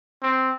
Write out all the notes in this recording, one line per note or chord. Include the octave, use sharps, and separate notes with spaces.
C4